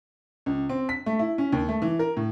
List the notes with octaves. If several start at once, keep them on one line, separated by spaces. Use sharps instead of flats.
C#2
C4
B6
A3
E4
C#4
D#2
A3
E3
A#4
A2